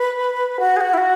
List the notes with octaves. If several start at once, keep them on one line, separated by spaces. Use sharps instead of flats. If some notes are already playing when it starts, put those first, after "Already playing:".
Already playing: B4
F#4
G#4
F#4
E4
F#4